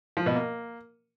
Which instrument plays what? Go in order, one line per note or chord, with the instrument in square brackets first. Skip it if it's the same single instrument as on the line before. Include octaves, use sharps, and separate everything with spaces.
[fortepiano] F3
B2
A#3